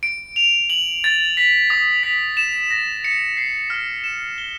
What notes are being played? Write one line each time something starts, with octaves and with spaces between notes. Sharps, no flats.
D7
F7
F#7
A6
B6
D#6
B6
E7
A#6
C#7
C7
F6
E7
G7